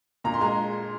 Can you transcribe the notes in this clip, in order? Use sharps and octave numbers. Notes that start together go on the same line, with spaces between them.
A#2 A#5
C6
G#3 A#5